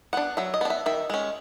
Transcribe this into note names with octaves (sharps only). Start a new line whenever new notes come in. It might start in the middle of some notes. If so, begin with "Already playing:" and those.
B3 D4 F#5
F#3 E5
D#5
B3 D4
E5
D#3 E5
G#3 C#4